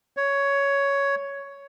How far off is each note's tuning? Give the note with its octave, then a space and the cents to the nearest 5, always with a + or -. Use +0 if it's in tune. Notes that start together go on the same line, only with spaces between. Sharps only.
C#5 +10